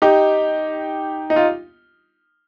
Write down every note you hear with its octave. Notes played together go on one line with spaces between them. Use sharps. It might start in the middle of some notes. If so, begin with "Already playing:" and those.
D#4 G4
D#4
F4